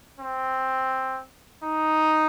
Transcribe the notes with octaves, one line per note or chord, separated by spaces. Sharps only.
C4
D#4